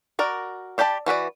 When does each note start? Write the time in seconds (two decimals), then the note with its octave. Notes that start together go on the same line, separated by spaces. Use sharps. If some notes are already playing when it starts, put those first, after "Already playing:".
0.19 F#4 A#4 D5
0.78 D4 G4 D5 A5 B5
1.06 E3 F#4 B4 D5